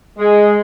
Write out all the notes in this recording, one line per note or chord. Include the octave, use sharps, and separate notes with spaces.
G#3